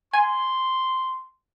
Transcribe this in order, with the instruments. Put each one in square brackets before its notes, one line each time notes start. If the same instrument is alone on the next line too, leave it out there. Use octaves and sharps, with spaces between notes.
[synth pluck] G#5 [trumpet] C6